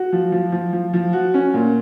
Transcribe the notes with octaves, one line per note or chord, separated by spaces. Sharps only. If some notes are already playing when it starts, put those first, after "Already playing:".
Already playing: F#4
F3
F3
F3
F3
F3
F#4
C#4
A#2